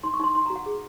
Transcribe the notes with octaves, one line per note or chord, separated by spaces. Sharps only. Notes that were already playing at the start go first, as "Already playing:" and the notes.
D#4 C6
C#6
D#4 C6
D#4 C6
A#5
F#4
F#5
G#4